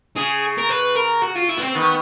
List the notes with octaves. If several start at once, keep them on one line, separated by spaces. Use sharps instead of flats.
C#3 G#4
A#4
B4
A#4
F#4
F4
E4
B3
C4
D#3 B3